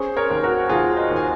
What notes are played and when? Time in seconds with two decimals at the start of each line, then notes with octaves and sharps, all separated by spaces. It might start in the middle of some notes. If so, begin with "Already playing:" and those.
Already playing: C#4 G#4 C5
0.17 A#4 C#5
0.30 D#2
0.43 F#4 A#4
0.69 D#2 F4 G#4
0.97 C5 D#5
1.10 D#2
1.16 G#5